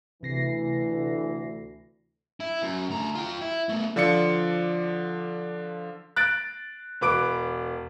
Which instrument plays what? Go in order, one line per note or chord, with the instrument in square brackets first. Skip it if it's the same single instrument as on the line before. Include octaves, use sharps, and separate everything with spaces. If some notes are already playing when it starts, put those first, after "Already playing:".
[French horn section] D2 E3 [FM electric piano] C3 A#6 C7
[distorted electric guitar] E4
F#2
D2 A#5
F4 G5
E4
A3 B3
[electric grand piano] D3 F3 F4 D5 C6 C#7
[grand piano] F#6 A6 D7
E1 B4 D6 D7